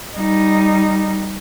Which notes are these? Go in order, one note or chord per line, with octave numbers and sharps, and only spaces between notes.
G3 D#4